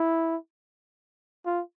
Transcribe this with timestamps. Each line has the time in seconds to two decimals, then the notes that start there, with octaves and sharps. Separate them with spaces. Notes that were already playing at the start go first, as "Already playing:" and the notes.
Already playing: E4
1.46 F4